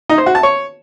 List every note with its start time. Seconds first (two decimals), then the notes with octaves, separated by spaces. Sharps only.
0.09 D#4
0.18 C5
0.26 F#4
0.35 A5
0.43 C#5